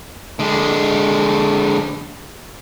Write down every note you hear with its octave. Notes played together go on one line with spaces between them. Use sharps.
D3 G#3